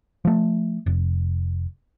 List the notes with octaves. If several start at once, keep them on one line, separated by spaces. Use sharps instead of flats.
F3 A3
F1